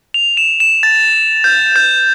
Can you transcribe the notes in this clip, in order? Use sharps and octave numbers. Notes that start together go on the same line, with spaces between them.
F7
E7
E7
A6
G6
G6